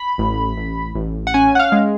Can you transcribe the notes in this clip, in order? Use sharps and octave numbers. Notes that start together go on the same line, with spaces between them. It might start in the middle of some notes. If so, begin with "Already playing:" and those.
Already playing: B5
A1
A1
A1
F#5
C#4 G#5
F#5
F5
G#3